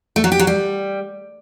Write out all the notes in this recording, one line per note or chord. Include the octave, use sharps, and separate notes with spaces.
A3
F#3
G4
F#3
G3